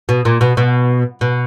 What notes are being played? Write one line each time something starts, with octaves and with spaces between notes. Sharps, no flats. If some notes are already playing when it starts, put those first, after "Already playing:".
B2
A#2
B2
B2
B2